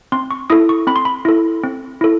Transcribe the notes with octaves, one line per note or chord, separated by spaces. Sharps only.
C4 C6
C#6
E4 A4 D#6
C#6
C4 B5
C6
B5
E4 A4
C4
E4 A4